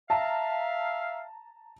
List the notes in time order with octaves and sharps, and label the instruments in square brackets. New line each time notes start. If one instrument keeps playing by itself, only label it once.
[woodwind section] E5 F5 [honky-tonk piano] A5 A#5